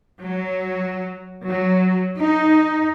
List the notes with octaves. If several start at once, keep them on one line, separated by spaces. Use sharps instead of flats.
F#3
F#3
D#4